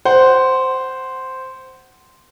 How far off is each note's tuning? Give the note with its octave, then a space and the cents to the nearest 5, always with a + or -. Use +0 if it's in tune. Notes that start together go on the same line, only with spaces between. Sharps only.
C5 -5 F#5 +15